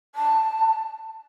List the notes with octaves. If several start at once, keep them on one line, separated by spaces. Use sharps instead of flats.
A5